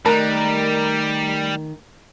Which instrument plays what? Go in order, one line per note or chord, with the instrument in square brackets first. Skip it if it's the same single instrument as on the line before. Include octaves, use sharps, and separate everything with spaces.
[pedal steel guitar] D#3 D#5 F#6 [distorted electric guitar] G3 [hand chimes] A3 [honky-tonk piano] A#4